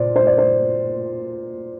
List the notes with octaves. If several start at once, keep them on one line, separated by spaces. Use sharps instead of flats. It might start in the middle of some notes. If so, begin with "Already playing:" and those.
Already playing: A#2 C5 D5
C5
D5
C5